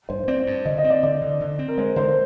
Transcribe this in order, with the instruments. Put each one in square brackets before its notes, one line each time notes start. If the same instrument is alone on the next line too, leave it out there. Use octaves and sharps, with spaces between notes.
[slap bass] G2 [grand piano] C5
[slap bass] C4 [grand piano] D5
[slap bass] G2
[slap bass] D3 [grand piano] D#5
[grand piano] D#5
[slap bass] C4
[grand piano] D5
[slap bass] D3 [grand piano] D5
[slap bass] D3
D3
C4
[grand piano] A#4
[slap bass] G#3 [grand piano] C5
[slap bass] D3 [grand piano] C5